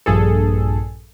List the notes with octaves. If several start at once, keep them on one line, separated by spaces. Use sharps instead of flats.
A#1 G2 G#4 A4